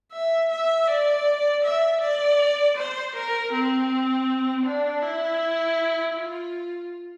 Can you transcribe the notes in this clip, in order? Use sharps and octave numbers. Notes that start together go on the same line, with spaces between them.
E5
E5
D5
E5
D5
C5
A#4
C4
D4
E4
F4